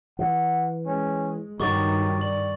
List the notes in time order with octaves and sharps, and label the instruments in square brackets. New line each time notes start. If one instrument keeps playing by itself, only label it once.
[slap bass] E3 [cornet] F#5
[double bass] G#3 [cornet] C#4
[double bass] G2 D#3 [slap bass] F#3 [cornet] D#4 [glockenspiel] C#6 D6 A6
[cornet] D5 [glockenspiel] F#7